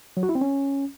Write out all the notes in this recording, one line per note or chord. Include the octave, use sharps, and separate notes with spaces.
F#3
F#4
E4
C4
C#4